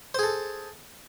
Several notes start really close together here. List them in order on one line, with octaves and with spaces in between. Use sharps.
C5 G#4 A4